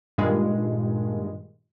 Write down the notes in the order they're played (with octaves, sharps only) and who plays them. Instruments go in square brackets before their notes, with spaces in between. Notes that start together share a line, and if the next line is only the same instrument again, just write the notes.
[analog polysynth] G2 A#2 D#3 G#3